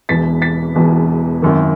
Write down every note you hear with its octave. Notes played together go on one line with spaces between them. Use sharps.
E1 E2 B2 A6 B6
A6 B6
E1 E2 B2
G#1 F#2 D#3